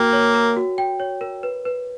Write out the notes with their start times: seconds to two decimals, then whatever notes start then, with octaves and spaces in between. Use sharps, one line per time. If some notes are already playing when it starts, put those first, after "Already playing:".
Already playing: A#3 F#4 G5
0.13 C#5
0.34 A#4
0.57 F#4
0.78 G5
1.00 C#5
1.21 A#4
1.43 B4
1.65 B4